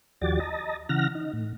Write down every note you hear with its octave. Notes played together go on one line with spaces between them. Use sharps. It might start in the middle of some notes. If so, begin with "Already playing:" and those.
D#2 F3 F#4 G4 D5 A6
D#5 A5 A#5
C#3 E3 F#5 F6 A#6
D#4
A2